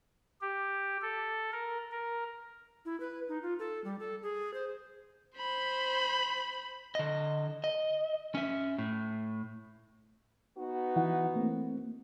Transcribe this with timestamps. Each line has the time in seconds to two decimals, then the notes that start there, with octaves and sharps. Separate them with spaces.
0.41 G4
1.02 A4
1.52 A#4
1.91 A#4
2.85 E4
3.00 B4
3.29 D#4
3.42 F4
3.59 A4
3.84 G3
3.99 A4
4.22 G#4
4.54 C5
5.37 C5 B5
6.95 D3 D#5
7.64 D#5
8.35 C#4 E5
8.78 A2
10.58 B3 D#4 F#4
10.96 E3 E4 F#5
11.36 A3 A#3 C4